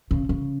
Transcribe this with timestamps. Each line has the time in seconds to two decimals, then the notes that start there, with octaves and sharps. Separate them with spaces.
0.11 C#3
0.29 C#3